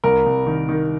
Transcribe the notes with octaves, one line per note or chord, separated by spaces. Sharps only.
C2 A#4
C2
D#3
D#3